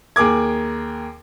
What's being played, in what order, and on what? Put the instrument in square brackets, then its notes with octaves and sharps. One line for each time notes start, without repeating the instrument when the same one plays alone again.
[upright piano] D#2 G#4 A#4 D6 G#6